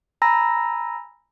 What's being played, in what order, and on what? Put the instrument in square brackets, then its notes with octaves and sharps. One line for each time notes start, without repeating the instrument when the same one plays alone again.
[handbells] G#5 A#5 B5 E6 A#6